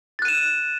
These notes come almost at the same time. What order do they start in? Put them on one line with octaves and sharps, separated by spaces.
A6 F#6 D#7 E7